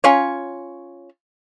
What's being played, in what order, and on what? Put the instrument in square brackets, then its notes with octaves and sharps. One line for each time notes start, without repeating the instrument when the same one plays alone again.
[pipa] C#4 F4 C#5